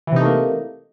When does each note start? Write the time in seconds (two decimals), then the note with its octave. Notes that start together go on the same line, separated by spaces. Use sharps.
0.07 E3
0.12 C3
0.16 D#4
0.21 A3
0.25 A#3